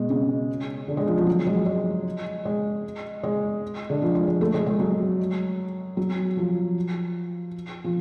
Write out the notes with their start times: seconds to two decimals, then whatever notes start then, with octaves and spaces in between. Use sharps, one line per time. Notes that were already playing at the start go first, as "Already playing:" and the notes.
Already playing: B2 G#3
0.10 C#3
0.88 D3
0.97 G#3
1.07 F3
1.18 F3
1.27 F#3
1.47 G#3
1.66 G#3
2.45 G#3
3.23 G#3
3.90 D3
4.02 F3
4.15 G#3
4.28 G#3
4.41 A3
4.54 G#3
4.67 G#3
4.80 F#3
5.97 F#3
6.37 F3
7.84 F3